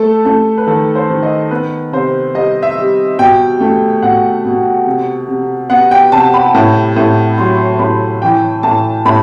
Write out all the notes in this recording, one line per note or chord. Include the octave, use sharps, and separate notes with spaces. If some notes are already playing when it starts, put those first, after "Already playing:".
Already playing: A3 A4
A3 A4
B4
D#3 A4
C5
D#3
D#5
B3 B4
C3 C5
G3 D#5
E5
G3
B2 G5
A3
B2 F#5
B2
C3
C3
B3 F#5
G5
C3 A5
B5
A2
A2
F#3 C6
A2 B5
E3 G5
A2 A5
A2 B5